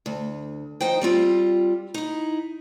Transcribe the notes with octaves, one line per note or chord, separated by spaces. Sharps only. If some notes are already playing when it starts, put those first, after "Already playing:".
D2
F3 D#4 C5 G5
G3 C4 F4
D#4 E4